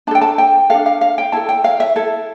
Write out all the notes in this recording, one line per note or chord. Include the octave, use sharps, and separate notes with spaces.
D4 A4 G5 A5
A5
G5
D4 A4 F5
F5
F5
G5
E4 A4 A5
G5
F5
E5
E4 A4